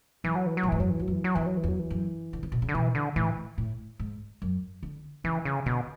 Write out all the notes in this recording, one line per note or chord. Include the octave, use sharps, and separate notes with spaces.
F#2 E3
F#3
E3
F#3
A2
G#2 E3
F#2 F#3
E3
E2 F#3
F#2
E3
F#3
E2 E3
F#3
E3
E2
F#3
E3
F#2
D3
C#3
B2
C#3
D3
B2 E3
D3
A2 E3
A2
G#2
F#2
D3
C#3 E3
C#3
B2 D3